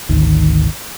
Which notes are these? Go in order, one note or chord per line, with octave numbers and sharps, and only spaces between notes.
G#1 D2 D#3